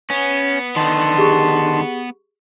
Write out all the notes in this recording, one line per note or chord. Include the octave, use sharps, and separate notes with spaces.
B3 C#4
D3 D#3 A5 C6
G4 G#4 C#6